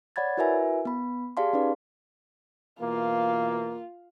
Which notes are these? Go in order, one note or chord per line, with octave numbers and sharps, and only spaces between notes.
C#5 D5 F#5 B5 G#6 A6
E4 F#4 A#4 B4 E5 G#5
B3 B5
G4 G#4 D5 F5 A5 C6
C#4 D#4 B4 D5
B2 E3 A#3 F4